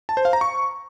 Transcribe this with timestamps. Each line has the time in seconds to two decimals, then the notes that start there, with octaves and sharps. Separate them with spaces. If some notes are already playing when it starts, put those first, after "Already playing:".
0.09 A5
0.17 C5
0.25 F5
0.33 A#5
0.41 C#6